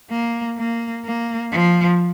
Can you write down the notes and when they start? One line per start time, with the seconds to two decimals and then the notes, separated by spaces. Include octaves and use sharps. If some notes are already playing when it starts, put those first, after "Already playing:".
0.11 A#3
0.58 A#3
1.05 A#3
1.52 F3